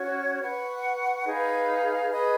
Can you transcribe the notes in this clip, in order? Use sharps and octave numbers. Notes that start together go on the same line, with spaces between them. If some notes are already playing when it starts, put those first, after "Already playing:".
Already playing: C#4 F#4 C#5
B4 F#5 C#6
D#4 G#4 B4 F5
G#4 B4 D#5